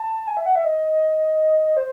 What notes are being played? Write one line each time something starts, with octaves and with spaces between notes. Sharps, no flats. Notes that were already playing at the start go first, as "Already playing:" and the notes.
Already playing: A5
G#5
E5
F#5
E5
D#5
C5